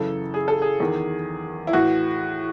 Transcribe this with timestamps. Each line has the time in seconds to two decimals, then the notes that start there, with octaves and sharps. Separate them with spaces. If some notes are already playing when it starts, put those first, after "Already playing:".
Already playing: F#2 C#3 E3 A4
0.34 G#4
0.48 A4
0.62 G#4
0.80 E2 D#3
1.67 E4
1.73 A2 E3 F#4